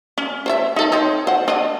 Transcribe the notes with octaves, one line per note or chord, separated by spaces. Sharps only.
C#4
C5 C#5 E5
D#4 A4
C4 D#4 C#5
C5 F#5
D4 D#5